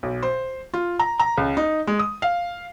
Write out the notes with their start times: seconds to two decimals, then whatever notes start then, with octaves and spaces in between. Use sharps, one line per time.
0.03 B1
0.23 C5
0.74 F4
1.00 A#5
1.20 A#5
1.37 C#2
1.57 D#4
1.87 G#3
1.99 D#6
2.22 F5